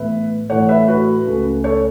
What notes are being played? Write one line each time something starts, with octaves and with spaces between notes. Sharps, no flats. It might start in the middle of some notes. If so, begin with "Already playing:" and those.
Already playing: A2 E3 B3 B4 E5
A2 E3 A3 C#5 F#5
B4 E5
F#4 B4
C#2 C#3 A3
A4 C#5